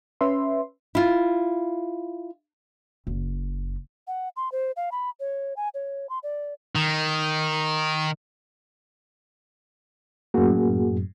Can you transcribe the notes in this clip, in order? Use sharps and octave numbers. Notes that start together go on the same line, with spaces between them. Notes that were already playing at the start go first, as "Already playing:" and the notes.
C#4 B4 E5 C6
E4 F4
F#1
F#5
C6
C5
F5
B5
C#5
G#5
C#5
C6
D5
D#3
F#2 A2 A#3 F#4 G#4